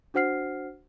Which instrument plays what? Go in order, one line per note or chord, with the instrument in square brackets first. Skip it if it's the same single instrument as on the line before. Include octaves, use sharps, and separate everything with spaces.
[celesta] D4 F#4 C5 F#5 F6 C7